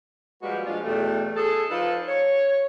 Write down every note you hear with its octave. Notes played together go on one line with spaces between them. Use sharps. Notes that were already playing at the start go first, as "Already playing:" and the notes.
F3 G3 G#3 A#3 F#4 B4
A#2 F3 G#3 D4 F4
E2 B2 F#3 G3 A3
G#4 A4
F3 D#4 F4 A4 B4 D5
C#5